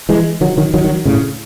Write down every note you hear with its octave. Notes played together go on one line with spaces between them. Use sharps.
E3 G#3
D#3 F#3
D#3 F#3
D#3 F#3
D#3 F#3
A2 C#3